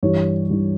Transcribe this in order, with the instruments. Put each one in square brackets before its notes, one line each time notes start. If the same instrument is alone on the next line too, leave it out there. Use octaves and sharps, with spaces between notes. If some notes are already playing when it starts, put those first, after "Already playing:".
[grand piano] G2 E3 G3 C#5
G2 E3 G3